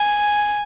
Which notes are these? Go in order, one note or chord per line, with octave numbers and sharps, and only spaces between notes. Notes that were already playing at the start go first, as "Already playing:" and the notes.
Already playing: G#5